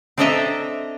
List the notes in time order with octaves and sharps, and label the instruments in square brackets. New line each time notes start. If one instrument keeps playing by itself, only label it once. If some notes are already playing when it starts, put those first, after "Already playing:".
[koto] C4 D4 A4 D#5 E5 A#5